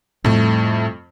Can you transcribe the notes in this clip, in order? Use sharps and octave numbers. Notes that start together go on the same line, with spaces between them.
F2 A2 G3 A3